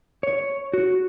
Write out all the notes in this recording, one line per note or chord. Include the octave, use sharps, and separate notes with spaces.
C#5
F#4